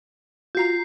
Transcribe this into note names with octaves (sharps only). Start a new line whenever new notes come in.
F4 F#4 A#5 G6 C7